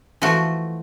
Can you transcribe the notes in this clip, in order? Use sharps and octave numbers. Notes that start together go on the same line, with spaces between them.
E3 F3 A3 F#4